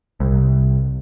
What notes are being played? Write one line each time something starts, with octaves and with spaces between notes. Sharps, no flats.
C2